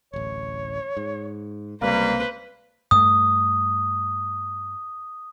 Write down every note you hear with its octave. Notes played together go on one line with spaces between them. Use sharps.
D1 A1 C#5
G#2
C#2 C3 G3 A#3 B4 C5
G2 A3 D#6